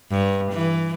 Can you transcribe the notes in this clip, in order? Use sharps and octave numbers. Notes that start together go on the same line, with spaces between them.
G2
E3